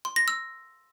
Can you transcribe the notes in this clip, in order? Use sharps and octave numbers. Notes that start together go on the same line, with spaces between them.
C6
A#6
E6